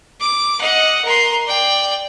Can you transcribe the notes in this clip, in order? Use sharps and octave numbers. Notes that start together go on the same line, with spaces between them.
D6
D#5 F#5
A#4 C6
D5 G5